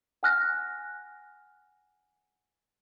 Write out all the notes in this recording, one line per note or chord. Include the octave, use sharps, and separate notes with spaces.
F#5 G#5 F6 F#6 A#6